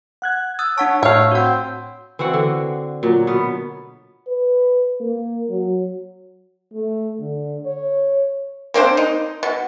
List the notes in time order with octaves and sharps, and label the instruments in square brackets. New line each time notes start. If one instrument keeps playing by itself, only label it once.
[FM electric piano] F#5 F#6 G#6
[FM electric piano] D#6 [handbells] E6 F#6 A6
[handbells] D4 F#5 A5 [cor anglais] C#5
[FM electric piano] A2 [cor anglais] A3 [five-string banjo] C#5 F5
[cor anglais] C4 [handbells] F#4 F#5
[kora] E3 C4 F#4 F#5
D3
A#2 F#3
B2 B3
[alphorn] B4
A#3
F#3
A3
D3
C#5
[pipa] A#3 C4 D4 C5
D#4
B2